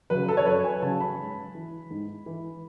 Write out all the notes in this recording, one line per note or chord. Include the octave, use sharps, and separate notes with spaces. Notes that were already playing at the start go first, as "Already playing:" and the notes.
C#3 F#3 B4
A4
C#5
F#2 B4
G#5
C#3 F#3 A5
B5
G#2
E3
G#2
E3